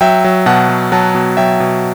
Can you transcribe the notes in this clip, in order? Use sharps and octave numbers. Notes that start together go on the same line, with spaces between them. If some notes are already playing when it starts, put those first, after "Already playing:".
F#3 E5 G5
F#3
B2 F#5 A5
F#3
F#3 F#5 A5
B2
F#3 E5 G5
B2